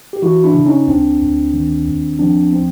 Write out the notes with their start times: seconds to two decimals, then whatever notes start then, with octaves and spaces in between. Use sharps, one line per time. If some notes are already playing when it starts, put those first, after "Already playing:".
0.13 G4
0.22 E3 E4 F#4
0.44 D4 E4
0.55 C#3
0.66 C#4 D#4
0.88 D2 C4 D4
1.21 D2
1.53 D#3
1.87 D#2
2.19 F3 C4 D4
2.53 C4